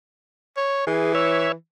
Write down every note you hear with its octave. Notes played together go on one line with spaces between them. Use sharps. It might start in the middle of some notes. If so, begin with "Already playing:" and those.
C#5
E3 G#4
C#5 E5